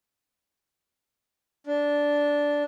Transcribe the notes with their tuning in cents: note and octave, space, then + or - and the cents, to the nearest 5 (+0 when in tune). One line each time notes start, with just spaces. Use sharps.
D4 -10